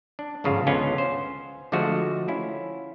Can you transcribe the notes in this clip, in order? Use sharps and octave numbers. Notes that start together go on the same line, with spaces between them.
D4
G1 G#2 C#3 F3 F4 A5
C#2 D3 B3 C#4 F4
C5
D3 F3 G#3 A3 F#4
C#4 E4 F4